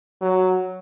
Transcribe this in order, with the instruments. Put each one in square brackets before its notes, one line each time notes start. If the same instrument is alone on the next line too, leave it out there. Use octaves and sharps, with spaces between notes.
[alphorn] F#3